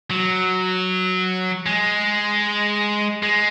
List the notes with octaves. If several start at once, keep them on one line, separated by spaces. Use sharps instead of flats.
F#3
G#3
G#3